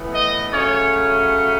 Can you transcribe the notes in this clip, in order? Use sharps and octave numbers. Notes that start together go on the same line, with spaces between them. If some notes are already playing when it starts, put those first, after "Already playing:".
Already playing: A2 E3 B3
D#5
C#3 F#3 A3 C#4 C#5